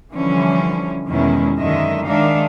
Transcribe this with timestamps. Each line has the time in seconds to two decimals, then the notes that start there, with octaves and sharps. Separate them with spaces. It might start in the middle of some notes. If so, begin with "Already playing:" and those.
0.12 D3 E3 F3 G3 C#4
1.08 E2 B2 D#3 G#3 C#4 E4
1.58 F#2 D3 D#3 G#3 D#5 E5
2.05 D#3 G#3 D4 D#4 E5 F5